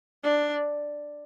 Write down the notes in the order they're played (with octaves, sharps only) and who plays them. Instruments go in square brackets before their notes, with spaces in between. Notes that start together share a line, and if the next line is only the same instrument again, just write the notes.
[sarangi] D4